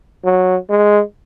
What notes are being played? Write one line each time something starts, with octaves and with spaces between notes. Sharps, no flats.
F#3
G#3